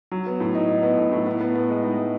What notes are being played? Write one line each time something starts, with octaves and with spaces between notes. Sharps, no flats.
F#3
B3
A2
D#4
D#4
B3
A2
A2
B3
B3
B3
G#3
D#4
G#3